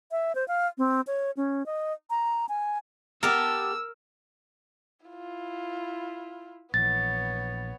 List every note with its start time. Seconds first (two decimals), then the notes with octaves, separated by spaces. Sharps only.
0.11 E5
0.35 C5
0.48 F5
0.78 C4
1.07 C#5
1.37 C#4
1.66 D#5
2.10 A#5
2.49 G#5
3.23 B3 G4 A4 A#4 E6
5.06 E4 F4
6.74 A#1 E3 B3 C#5 A6